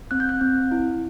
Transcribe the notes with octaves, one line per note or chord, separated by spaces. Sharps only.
C4 F#6
G6
F#6
C4
E4